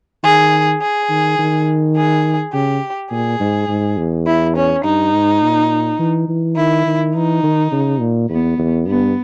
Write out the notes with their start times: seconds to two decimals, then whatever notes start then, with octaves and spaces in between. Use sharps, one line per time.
0.23 D#3 G#4
0.81 G#4
1.10 D#3
1.39 D#3
1.96 G#4
2.53 C#3 G4
3.11 A#2 G#4
3.40 G#2
3.69 G#2
3.97 E2
4.26 E4
4.55 C#4
4.84 G2 D#4
5.12 G#2
5.42 A#2
5.99 E3
6.28 E3
6.56 D#3 E4
6.86 D#3
7.14 E3 D#4
7.43 D#3
7.72 C#3
8.00 A#2
8.29 E2 B3
8.58 E2
8.87 G2 B3